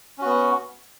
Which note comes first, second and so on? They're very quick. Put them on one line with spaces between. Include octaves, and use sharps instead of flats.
C#4 F#4 B3